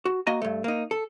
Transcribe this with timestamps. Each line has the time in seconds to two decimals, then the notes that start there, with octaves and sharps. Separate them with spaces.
0.05 F#4
0.27 A#3 F#4 D#5 G#5 A#5
0.42 G2 A3
0.64 A#3 D#4
0.91 A4